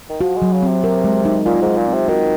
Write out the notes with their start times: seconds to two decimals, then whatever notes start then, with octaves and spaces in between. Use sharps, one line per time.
0.09 D#3
0.21 F3 F#4
0.37 F#3 G#3
0.53 C#3
0.63 C3 C4
0.84 A#4
1.04 G#3
1.25 D#4
1.45 A#2 F4
1.62 G#2 G#3
1.78 A#2
1.87 C4
1.93 C3
2.08 D#3 F#4